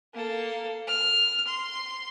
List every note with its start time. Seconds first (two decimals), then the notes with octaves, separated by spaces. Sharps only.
0.14 A#3 A4
0.87 F6
1.47 C6